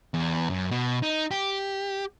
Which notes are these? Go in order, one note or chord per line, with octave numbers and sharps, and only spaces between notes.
E2
F#2
B2
D#4
G4